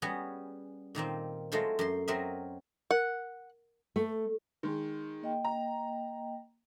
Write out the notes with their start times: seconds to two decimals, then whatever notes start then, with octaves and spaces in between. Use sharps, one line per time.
0.02 G3 B3 C#4 F#4 G#4
0.95 A#2 D#3 A#3 C4
1.52 F#3 G#3 A3 F4 A4 C5
1.79 F#2 C6
2.08 F#3 C4 A#4 D#5 E5
2.91 A#4 F#5
3.96 A3
4.63 D#3 G#3
5.22 A#3 D#5 G5
5.45 A#5